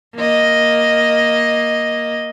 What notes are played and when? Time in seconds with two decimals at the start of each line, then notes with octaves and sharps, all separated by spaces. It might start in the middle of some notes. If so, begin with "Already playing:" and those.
0.16 A#3 D#5